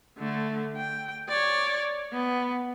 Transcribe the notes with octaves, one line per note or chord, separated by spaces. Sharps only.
D3 A3
G5
C#5 D5
B3